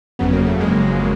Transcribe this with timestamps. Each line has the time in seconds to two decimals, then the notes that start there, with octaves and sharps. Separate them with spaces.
0.19 G1 F2 C#3 F#3 B3
0.33 A#3
0.47 A3
0.60 G#3 A#3